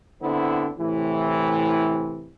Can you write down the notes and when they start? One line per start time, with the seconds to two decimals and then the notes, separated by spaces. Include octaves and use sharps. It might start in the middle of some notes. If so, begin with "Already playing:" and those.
0.22 D3 B3 C4 E4
0.79 A2 C3 E3